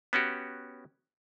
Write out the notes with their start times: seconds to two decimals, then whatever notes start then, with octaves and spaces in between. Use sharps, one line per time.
0.13 B3 C#4 F#4 G4